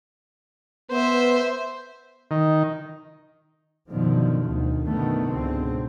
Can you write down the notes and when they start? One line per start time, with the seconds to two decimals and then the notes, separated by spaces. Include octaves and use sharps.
0.91 B3 C5 E5
2.31 D#3
3.89 F#2 B2 D3 D#3 F3
4.43 D2 B2 D#3
4.85 F#2 B2 D3 D#3 A3 B3
5.30 C#2 G#2 B2 D3 C4